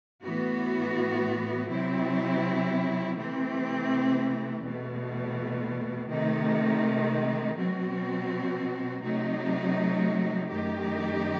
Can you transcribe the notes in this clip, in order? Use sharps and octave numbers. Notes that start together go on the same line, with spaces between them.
A2 E3 B3 F#4
C3 F#3 C4 E4
C3 E3 A3 C4
E2 B2 A3
C3 D#3 A3 D#4
B2 F#3 C4 F#4
C3 F#3 A3 C4 D#4
F#2 D#3 A3 D#4 G4